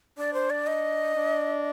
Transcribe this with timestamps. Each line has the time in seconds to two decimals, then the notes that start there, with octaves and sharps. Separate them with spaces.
0.17 D4 D5
0.34 C5
0.50 D5
0.67 D#5
1.16 D4